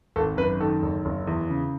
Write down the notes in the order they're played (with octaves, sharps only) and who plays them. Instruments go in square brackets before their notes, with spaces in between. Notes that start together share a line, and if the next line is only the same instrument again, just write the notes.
[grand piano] G#1 A4
F#2 B4
D#3 A4
F#1
F#1
E2
C#3